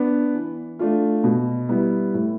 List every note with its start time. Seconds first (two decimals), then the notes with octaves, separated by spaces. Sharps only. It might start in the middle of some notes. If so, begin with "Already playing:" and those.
Already playing: B3 D4
0.34 E3
0.79 A3 D4 F4
1.24 B2
1.69 G3 B3 E4
2.14 A2